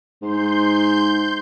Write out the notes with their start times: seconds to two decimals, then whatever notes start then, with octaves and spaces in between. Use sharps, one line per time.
0.22 G#2 C6 G6